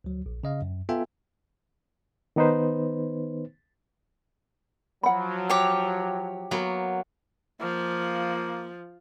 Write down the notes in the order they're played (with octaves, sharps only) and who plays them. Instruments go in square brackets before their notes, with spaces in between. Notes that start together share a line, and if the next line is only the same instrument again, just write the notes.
[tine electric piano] D2 F#3
A#1
C#3 D#5 F5
F#2
B3 F4 A4 E5 G5 G#5
[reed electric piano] D#3 B3 D#4 B4 C5
[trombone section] F3 F#3 [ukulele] F#5 B5
[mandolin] G4 C#5 D6 [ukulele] G5
[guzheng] F#3 A#3 B3
[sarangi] F3 [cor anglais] A#3